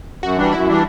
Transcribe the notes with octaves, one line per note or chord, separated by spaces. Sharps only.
F#2 F#4
E3 G3 D4
F#2 E4
E3 G3 D4